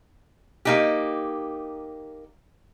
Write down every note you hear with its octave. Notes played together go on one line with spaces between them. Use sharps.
A#3 D#4 G4